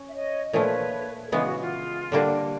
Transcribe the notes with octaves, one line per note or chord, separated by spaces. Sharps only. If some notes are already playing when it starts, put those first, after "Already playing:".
Already playing: C#4
E5
C#5 D#5
A#2 F3 A3 B4 C#5
A4
C#3 E3 G#3 B3 G#4
F#4
F4
D3 G3 A#3 D4